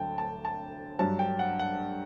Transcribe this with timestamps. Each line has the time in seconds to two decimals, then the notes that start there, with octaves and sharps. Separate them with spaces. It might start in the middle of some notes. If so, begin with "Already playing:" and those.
Already playing: D2 D3 F#3 G5 A5
0.18 A5
0.45 A5
0.99 G2 F#3 A5
1.19 G5
1.39 F#5
1.59 F#5